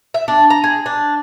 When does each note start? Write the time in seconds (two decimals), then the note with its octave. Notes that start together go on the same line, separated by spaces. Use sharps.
0.14 E5
0.28 D4
0.50 A#5
0.64 G#4
0.86 D4